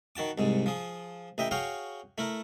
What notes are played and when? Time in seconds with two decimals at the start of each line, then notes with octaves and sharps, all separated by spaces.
0.16 D#3 F#4 A5 D6
0.38 C2 G#2 G#3
0.66 F3 G#4
1.38 A1 D#5 E5 G5
1.51 F#4 G#4 C#5 F5 G5
2.18 A3 E4 A#4